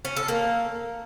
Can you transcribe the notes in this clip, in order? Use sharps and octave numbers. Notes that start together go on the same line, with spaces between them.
C#4
A4
A#3